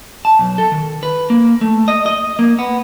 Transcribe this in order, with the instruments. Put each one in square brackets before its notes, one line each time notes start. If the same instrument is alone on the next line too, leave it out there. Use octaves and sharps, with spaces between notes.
[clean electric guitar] A5
B1
A4
D#3
B4
A#3
A3
D#5
D#5
A#3
B3